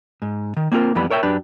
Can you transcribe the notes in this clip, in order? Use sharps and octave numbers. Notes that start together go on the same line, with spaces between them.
G#2
D#3
A#3 C4 F4 G#4 A#4
F2 E3 G3 B3 B5
A#4 C#5 E5 G5
F#2 D4 G4 B4